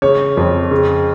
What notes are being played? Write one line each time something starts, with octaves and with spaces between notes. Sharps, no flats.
C#3 C#5
F2
C#3